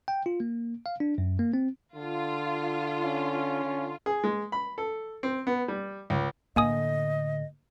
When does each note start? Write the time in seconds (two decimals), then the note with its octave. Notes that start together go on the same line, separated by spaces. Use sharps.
0.08 G5
0.26 F4
0.40 A#3
0.86 F5
1.00 D4
1.18 F#2
1.39 A#3
1.54 C4
1.96 D3 F4
3.04 C#4
3.64 D3
4.06 G#4
4.24 G#3
4.52 B5
4.78 A4
5.23 C4
5.47 B3
5.68 G3
6.10 C#2
6.56 A2 D3 A#3 D#5 G#5 D#6